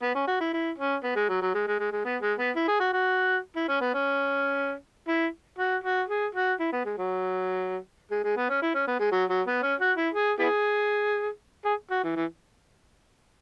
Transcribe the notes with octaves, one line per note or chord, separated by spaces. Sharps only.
B3
C#4
F#4
E4
E4
C#4
B3
G#3
F#3
F#3
G#3
G#3
G#3
G#3
B3
G#3
B3
E4
G#4
F#4
F#4
E4
C#4
B3
C#4
E4
F#4
F#4
G#4
F#4
E4
B3
G#3
F#3
G#3
G#3
B3
C#4
E4
C#4
B3
G#3
F#3
F#3
B3
C#4
F#4
E4
G#4
B3 E4 G#4
G#4
F#4
E3
E3